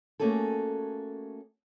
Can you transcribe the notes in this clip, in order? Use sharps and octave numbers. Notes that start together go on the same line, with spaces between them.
A3 A#3 C#4 F#4 G#4 A4